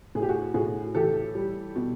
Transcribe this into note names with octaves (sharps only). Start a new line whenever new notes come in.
A2 G#4
G4
F#4 G#4
A2 F#4 G#4
E3 G4 A4
G3
B2